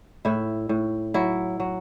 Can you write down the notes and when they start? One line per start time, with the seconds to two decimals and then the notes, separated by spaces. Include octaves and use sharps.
0.25 A2 E4
0.69 A2
1.14 F#3 E4
1.60 F#3